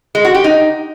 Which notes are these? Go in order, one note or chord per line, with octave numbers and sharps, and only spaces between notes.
G#3
F#4
G4
D#4